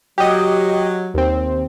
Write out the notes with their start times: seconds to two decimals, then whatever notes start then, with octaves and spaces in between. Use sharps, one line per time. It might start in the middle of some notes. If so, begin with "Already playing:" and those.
0.18 F#3 G4 D#5
1.14 D#2 C4